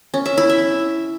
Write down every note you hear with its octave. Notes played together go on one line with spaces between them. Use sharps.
C#4
E5
E4
E5